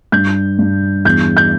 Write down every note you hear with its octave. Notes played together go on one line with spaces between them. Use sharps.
G2 G6
G2
E2 G6
G6